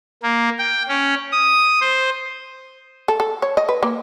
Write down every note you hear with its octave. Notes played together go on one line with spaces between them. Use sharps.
A#3
G5
C#4
D#6
C5
A4
A4
C#5
D#5
B4
A#3